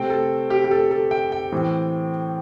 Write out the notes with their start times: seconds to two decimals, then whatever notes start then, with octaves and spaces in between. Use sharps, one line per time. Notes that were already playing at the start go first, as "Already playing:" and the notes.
Already playing: C3 A3 C4 G5
0.10 A4
0.50 G4
0.64 G4
0.71 A4
0.91 A4
1.11 G5
1.32 G5
1.52 A2 E3 C4